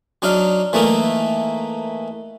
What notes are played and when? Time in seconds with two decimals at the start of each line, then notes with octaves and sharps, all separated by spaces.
0.22 F#3 D4 D#4 F5
0.73 E3 A3 A#3 D#4